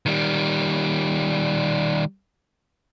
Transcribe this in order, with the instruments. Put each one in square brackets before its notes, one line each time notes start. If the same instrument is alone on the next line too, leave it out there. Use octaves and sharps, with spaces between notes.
[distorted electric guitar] D#3 G3